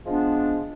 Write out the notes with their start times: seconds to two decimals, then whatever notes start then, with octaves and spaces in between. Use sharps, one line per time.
0.06 F3 G#3 B3 D4